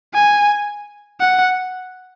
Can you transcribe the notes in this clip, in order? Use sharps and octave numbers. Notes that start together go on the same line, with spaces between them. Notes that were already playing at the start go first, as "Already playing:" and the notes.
G#5
F#5